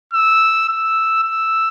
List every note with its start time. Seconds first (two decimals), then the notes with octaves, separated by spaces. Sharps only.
0.13 E6
0.69 E6
1.23 E6